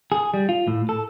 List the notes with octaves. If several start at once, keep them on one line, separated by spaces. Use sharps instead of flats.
G#4
G3
F4
A2
A4